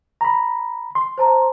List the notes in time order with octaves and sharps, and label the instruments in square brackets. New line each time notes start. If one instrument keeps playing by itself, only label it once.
[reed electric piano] A#5 B5
C6
[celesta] C5 A5 A#5